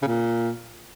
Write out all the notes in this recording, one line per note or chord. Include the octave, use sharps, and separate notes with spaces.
C#3
A#2